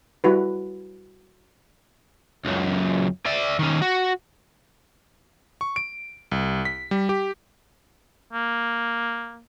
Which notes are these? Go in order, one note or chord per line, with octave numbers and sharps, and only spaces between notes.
G3 E4 F#4 B4
C#2 F#2
D5 E5
D#3 C#4
F#4
C#6
D7
C2
B6
G3
G4
A#3